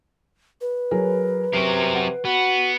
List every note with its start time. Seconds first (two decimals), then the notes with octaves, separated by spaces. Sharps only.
0.61 B4
0.91 F#3 G#4 A#4
1.53 C3 F#3 A#4 C7 D7
1.94 F#5
2.25 B3 F#4